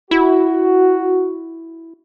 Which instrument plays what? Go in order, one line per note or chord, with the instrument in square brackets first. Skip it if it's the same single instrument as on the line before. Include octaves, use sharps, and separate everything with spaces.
[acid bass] E4 [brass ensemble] F#4